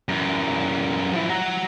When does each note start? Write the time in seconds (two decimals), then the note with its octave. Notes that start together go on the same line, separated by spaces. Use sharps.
0.09 F#2 E3
1.13 F3 E4
1.30 F#4 A#5